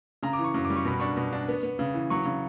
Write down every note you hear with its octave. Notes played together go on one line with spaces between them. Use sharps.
C#3 A#5
D6
E3
C#6
F#2
D6
G3
C#6
B2 B5
D4 C#6
B2
D4
B3
B3
C#3
E3
F#3 C#6
C#3